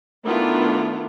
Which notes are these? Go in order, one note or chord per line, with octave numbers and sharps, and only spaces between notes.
D#3 A3 B3 D4 E4 F4